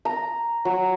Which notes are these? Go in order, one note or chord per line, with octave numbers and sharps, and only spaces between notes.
A#5
F#3